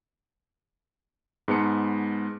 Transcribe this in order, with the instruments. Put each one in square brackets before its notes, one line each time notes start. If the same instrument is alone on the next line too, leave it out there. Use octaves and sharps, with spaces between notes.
[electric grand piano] G#2 G#3 B3 A5 C#7